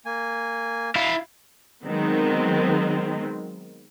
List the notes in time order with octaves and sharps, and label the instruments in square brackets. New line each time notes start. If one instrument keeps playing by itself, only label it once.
[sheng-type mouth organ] A#3 G#5
[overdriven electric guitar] E4 F5
[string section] D#3 F#3 G#3 B3 C4